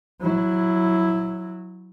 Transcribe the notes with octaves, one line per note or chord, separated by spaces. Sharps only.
F#3 E4